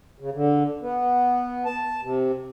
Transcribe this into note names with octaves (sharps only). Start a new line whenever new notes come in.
C#3
D3
B3
A5
C3